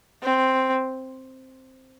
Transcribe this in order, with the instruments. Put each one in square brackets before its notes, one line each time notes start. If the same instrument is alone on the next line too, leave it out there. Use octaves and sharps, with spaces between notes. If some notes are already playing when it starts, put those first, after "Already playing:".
[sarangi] C4